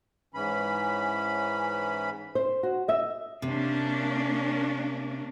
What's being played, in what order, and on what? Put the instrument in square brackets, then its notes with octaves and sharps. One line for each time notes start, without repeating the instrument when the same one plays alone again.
[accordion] G#2 E3 C#4 B5
[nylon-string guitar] C5
F#4
D#5 E5
[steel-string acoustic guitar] C3 [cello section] A#3 C#4 D4